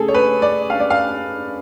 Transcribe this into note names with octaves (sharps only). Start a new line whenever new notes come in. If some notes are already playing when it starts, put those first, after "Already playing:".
Already playing: C#3 A3 G#4 A4
C#5
B4
D5
F5
D5
F5